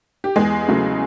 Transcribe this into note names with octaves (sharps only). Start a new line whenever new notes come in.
G4
E2 G#3 G#4
C#3 F#3 A3